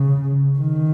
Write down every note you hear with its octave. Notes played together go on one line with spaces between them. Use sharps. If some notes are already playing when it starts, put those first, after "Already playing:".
Already playing: C#3
D#3